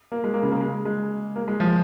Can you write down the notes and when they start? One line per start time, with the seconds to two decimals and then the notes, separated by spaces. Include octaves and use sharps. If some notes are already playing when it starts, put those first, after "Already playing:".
0.12 A#3
0.24 G#3
0.34 A#3
0.43 C#3
0.52 A#3
0.61 G#3
0.85 G#3
1.36 A#3
1.48 G#3
1.60 F3